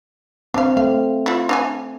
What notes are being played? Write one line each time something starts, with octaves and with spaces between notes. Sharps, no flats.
C4 D4 F5
A3 F5
E4 F4
D4 F5 G#5